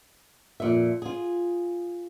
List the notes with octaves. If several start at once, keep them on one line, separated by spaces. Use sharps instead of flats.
F2 A#2 E5
F4 G#4